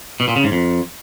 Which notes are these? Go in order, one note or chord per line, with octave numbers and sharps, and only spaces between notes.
B2
A#2
C#3
G#2
F2